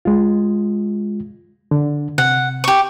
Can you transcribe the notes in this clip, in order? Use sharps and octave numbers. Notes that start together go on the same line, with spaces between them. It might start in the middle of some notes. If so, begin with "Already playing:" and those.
G#3 F4
D3
C3 F#5
G4 C#6